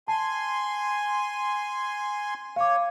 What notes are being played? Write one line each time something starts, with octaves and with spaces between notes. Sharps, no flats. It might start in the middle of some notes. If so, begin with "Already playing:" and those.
G#5 A5 C6
C#5 F5 D6